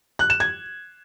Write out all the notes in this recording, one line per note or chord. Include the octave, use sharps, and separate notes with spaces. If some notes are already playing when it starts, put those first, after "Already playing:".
F#6
E7
G#6